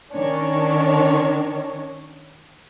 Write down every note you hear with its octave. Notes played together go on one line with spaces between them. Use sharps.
D#3 C#4 D4 C#5